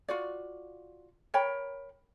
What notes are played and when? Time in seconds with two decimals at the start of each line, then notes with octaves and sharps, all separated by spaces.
0.08 F4 F#4 D5
1.34 A#4 C#5 G5 B5